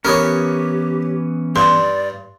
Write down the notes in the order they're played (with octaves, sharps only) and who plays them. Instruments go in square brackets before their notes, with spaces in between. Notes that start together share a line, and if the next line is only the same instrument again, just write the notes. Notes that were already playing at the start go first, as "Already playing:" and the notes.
[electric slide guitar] E3 B3 C#4 [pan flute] G4 [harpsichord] A#4 B4 C#5
[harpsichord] G2 [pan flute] D5 [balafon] C6